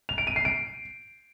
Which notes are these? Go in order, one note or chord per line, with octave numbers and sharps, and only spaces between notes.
F7
D7
D#7
C7
D7